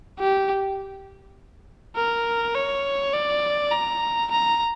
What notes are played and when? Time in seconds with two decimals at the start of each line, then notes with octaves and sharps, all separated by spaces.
0.20 G4
1.96 A#4
2.55 C#5
3.14 D5
3.72 A#5
4.31 A#5